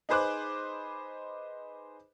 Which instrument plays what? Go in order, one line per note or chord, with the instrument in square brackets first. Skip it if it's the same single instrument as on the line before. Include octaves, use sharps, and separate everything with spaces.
[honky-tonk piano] D#4 G#4 B4 C5 D6 F#6